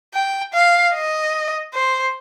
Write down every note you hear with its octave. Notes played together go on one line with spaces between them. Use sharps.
G5
F5
D#5
C5